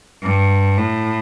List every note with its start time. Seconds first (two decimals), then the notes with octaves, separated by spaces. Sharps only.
0.23 G2
0.78 A2